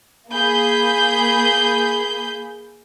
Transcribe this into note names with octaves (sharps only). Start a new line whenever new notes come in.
A#3 G#4 B5 G6